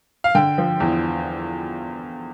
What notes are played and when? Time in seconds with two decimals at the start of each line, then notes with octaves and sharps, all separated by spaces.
0.24 F5
0.35 D3 G5
0.58 F3
0.80 E2